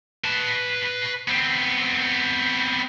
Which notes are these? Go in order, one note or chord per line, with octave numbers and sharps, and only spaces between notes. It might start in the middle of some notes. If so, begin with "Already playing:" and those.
B4 A5
B3 C4